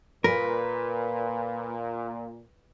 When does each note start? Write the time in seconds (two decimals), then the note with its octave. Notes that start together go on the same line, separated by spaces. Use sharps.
0.24 A#2 A#4 B4